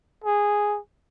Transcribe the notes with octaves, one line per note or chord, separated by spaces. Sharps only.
G#4